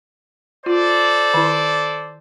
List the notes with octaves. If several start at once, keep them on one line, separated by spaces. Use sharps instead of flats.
F4 A4 C5 D5
D#3 E4